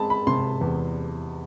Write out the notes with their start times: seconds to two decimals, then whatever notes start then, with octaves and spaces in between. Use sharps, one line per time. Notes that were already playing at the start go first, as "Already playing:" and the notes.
Already playing: G#3 C4 A5 B5
0.10 B5
0.27 C3 C6
0.61 E2